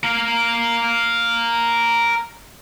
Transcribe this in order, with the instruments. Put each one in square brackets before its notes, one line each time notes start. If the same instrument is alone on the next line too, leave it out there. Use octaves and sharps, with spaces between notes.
[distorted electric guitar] A#4 F5